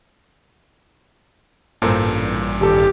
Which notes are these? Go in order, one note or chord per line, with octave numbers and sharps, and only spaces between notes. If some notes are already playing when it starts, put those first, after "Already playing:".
A1 G2 A#2 A4 A#4 C5
D#1 G4 A4